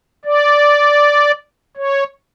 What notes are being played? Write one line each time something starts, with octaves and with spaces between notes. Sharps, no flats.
D5
C#5